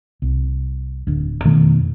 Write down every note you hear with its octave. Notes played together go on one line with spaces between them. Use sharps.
C2
D1 D2
F2 B2 D#3 A3